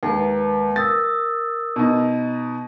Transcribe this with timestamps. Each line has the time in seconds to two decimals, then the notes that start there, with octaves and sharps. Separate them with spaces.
0.03 D#2 G#3 A#3 B4
0.76 A#4 D#6 E6 A6
1.76 B2 D#4